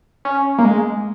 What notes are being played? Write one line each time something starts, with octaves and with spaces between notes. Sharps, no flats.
C#4
A#3
G#3